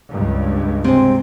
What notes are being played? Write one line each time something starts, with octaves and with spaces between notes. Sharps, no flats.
C#2 G2
C3 G#3 C4